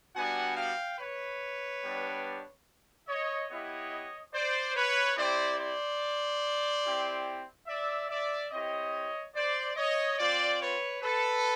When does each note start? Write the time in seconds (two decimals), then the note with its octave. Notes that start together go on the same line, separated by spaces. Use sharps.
0.15 G3 B3 D4 F#4 F#5 G#5
0.57 F5 G5
0.99 B4 C#5
1.83 G3 B3 D4 G4
3.08 C#5 D#5
3.49 B3 E4 G4 C#5 D#5
4.33 C5 D5
4.75 B4 C#5
5.17 C4 E4 G4 C5 D5
5.58 C5 D5
6.84 C4 E4 G4
7.67 D5 E5
8.09 D5 E5
8.51 C4 E4 G4 C#5 D#5
9.35 C5 D5
9.76 C#5 D#5
10.18 C4 F4 C5 D5
10.60 B4 C#5
11.02 A4 B4